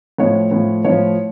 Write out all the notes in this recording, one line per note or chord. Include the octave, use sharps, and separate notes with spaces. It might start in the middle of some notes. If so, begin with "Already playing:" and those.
A2 F3 C#5
A2 F3
A2 F3 C#5